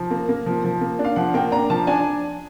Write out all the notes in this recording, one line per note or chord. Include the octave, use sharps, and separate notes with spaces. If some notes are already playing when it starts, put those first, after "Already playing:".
Already playing: F3
A#3
A#3
F3
F3
A#3
D4
F5
F3 F#5
A#3 G5
D4 A#5
F3 A5
D4 G#5